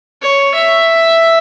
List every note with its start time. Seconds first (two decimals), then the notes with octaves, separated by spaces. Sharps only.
0.22 C#5
0.55 E5